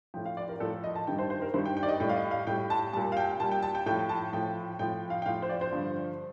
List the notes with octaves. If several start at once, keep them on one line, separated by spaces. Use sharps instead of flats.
A2 F3 G5
F5
D5
A#4
A2 F3 A4
D#5
A5
G2 D#3 G3 G5
C5
C5
A#4
G2 D#3 G3 C5
G5
G5
D5
D#5
A2 G3 G5
F5
D#5
F5
A2 G3 G5
A5
A#2 G3 A5
F5
G5
A#2 G3 A5
G5
A5
G5
A2 F3 G5
A5
A2 F3 G5
A2 F3 G5
F5
G5
A2 F3 F5
C5
D5
C5
G2 D3 F3